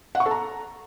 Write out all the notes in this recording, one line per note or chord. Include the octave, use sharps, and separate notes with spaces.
F#5
C#6
A4
A#5